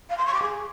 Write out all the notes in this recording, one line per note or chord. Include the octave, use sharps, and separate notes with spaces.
F5
C6
C#6
D6
G#4